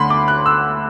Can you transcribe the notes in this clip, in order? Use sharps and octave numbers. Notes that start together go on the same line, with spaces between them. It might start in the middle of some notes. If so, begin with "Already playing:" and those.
Already playing: D2 D3 B5 C6
D6
F#6
E6